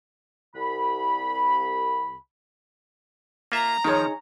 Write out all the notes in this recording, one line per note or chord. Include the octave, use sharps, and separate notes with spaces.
C2 B5
A#3 F4 E5 A#5
D#3 F3 D#4 G#4 C#5